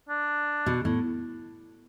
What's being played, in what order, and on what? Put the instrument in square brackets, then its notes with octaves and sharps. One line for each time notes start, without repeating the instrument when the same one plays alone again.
[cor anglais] D4
[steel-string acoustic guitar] B2
A2